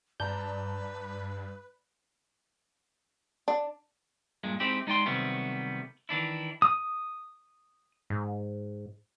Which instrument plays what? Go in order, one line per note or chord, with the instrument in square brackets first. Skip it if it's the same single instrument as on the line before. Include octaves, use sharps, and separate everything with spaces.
[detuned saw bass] G2 [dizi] B4 [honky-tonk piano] D5 A5 A#5 [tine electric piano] G6
[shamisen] D4
[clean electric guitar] G2 A#2 G#3
G#3 C4 D#4 E4 G4
G#3 D#4 D5 G5 C6
C3 D#3 F#3 G3 A3 B3
D#3 E3 D4 E4
[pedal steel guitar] D#6
[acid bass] G#2